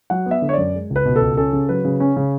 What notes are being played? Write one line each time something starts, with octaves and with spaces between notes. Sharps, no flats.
F#3 F#5
B3 E5
D3
C#5
F#2 D5
G#3
C#2
B4
B2
A4
C#2
C#4 A4
C#3
F#3 B4
C#3
C#4
C#3